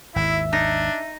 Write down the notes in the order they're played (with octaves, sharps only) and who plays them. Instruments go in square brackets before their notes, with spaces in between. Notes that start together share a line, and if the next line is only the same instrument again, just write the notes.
[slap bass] G#1 D#2 [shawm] E4 [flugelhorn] E5
[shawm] D4 [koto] D#4